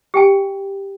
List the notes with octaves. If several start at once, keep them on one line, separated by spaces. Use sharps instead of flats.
G4 G5 G#5